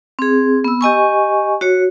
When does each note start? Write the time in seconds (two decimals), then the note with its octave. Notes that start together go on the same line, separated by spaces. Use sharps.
0.19 C4 G#4
0.64 B3 E6
0.81 G4 D#5 G#5 C#6
1.61 F#4 C#5